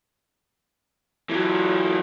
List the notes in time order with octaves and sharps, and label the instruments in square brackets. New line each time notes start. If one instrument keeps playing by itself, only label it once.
[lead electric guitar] E3 F#3